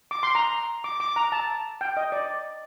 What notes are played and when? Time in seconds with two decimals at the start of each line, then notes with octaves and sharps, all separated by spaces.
0.11 D6
0.23 C6
0.35 A#5
0.84 D6
1.00 D6
1.16 A#5
1.32 A5
1.81 G5
1.97 D#5
2.12 D5